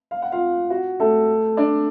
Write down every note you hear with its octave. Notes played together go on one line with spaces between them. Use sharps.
F5
F#5
F4 F5
F#4
A3 A4
D4 D5